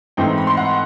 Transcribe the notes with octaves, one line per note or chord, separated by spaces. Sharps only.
G#2 E3 A3 C4 G5
A#5
B5
C6
F#5